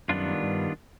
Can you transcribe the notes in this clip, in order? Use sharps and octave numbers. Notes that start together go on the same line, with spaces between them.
F#2 D#3 G3 B3 D4 F4
G2